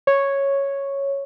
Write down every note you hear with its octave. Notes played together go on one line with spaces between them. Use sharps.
C#5